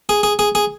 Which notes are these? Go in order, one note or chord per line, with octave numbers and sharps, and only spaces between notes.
G#4
G#4
G#4
G#4